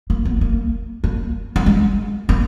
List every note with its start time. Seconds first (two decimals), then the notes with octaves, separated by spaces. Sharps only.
0.10 A#3
0.25 B3
0.41 A#3
1.04 A#3
1.56 A#3
1.66 G#3
2.29 A#3